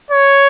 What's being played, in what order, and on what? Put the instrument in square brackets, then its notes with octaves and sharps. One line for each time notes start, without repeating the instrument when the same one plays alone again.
[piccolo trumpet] C#5